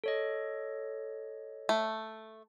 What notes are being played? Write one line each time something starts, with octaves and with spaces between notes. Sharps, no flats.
A4 C#5 D#5
A3